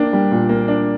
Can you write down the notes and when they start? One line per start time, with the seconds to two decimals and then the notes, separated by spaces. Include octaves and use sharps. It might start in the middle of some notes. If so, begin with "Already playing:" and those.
Already playing: A#3 D4 G5
0.13 G3
0.32 A#2
0.49 A#3
0.68 D4